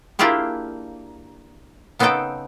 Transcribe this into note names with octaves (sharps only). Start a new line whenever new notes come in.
A#3 D4 E4 F4 G4 G#4
C#3 B3 C4 D#4 A4 G5